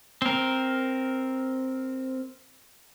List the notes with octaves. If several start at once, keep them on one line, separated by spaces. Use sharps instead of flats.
C4 A#4